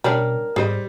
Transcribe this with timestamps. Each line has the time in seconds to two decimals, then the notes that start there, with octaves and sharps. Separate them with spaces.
0.04 B2 G3 C#4 D4 A#4
0.56 G#2 G3 G#4 C5 D#5